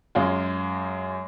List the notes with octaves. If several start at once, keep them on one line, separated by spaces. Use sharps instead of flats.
F#2 G#3 F4